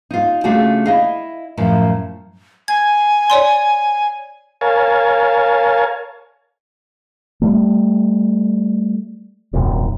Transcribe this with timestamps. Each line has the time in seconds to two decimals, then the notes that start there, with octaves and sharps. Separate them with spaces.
0.11 D#4 F4
0.44 C#3 A3 D4 F4 F#4 G#4
0.86 E4 D#5 F5
1.57 F#2 A2 F3
2.68 G#5 G#6
3.30 C#5 D5 C6
4.61 A#4 C#5 F5 G#5 A5
7.42 G3 A3
9.53 D#1 C2 F#2